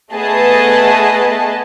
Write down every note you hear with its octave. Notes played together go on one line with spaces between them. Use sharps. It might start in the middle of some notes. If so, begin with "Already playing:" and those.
A3 B3 G#4 B4 D#5 A5